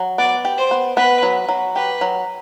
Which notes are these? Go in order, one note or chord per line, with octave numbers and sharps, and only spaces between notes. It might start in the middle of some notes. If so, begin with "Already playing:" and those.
Already playing: F#3
B3 D5
G4
C5
B3
B3 B4
F#3
F#3
G4 B4
F#3